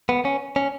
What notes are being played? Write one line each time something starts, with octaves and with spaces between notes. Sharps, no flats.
B3
C#4
C#4